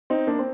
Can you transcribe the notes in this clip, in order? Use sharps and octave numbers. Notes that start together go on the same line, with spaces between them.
C4 D#4
A#3 D4
C4